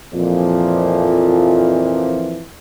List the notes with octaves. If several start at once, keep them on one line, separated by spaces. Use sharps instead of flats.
F2 A#2 E3 F3